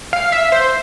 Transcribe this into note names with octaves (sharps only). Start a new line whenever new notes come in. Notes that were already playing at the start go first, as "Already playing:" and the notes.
F5
E5
C5